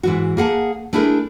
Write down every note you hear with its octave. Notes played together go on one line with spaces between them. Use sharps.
G#2 E3 F#4
A#3 G#4 F#5 A5
A3 D4 E4 G#4 A#4